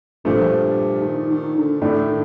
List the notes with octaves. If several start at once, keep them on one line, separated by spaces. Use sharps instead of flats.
G2 A#2 F3 A3
D#3
D#3
D3
A2 D3 A3 D4
D#3